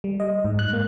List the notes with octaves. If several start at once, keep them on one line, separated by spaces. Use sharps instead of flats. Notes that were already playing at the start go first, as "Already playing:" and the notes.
G3
D#5
G#2
F#6
A#3